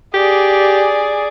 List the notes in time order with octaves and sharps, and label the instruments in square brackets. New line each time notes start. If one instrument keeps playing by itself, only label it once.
[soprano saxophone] G4 [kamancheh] G#4 D5